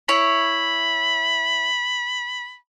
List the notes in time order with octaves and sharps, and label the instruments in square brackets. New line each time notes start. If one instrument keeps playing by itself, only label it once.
[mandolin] E4 C#5 [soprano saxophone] B5